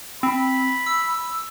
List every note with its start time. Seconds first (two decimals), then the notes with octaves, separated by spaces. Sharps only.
0.23 C4 B5
0.86 E6